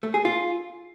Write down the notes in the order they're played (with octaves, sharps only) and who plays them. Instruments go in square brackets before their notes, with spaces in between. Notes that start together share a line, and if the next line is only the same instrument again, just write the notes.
[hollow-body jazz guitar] A3
G#4
F4